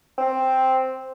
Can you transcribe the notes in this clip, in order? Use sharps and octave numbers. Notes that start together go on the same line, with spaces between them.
C4